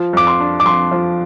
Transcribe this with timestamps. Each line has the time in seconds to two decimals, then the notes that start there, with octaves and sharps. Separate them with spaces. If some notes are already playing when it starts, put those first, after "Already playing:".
Already playing: F3
0.13 F2 D6
0.27 C6
0.40 D4
0.60 D6
0.65 F2 C6
0.91 F3